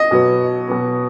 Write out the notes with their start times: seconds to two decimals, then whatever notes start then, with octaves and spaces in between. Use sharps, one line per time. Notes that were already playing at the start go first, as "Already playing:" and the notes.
Already playing: D#5
0.11 B2 F#3 B3
0.68 B2 F#3 B3